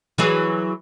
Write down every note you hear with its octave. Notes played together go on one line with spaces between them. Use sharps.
E3 F#3 G#4